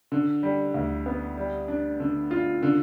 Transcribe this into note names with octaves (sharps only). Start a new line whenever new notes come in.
D3
G3
D2
B3
G3
D4
D3
F4
D3